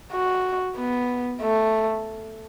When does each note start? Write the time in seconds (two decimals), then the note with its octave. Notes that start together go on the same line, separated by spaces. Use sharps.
0.13 F#4
0.76 B3
1.41 A3